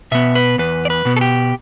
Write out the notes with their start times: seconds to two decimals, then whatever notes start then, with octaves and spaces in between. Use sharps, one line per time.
0.11 B2 B3 E5
0.35 B4
0.58 E2 B4
0.85 D5
0.90 B4
1.05 B2 B3
1.16 A4
1.21 G4